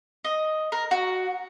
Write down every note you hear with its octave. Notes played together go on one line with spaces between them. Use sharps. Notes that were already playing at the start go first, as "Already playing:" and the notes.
D#5
A#4
F#4